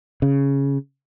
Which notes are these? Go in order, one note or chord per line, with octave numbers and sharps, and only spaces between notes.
C#3